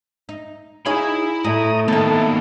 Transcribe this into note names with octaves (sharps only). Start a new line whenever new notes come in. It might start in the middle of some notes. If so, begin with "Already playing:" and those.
D#4
D#4 E4 G#4 C#5 F5 B5
A2 A3 A#5 D#6
D#3 A#3 B3 E4 A4 A5